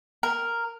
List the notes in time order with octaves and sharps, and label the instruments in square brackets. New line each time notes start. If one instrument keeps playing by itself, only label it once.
[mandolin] A#4